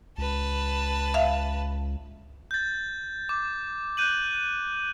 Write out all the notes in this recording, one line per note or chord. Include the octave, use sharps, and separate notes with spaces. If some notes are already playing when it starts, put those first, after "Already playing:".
C#2 B4 A5
E5 F5
G6 A6
D6
F#6 G6 D#7 F#7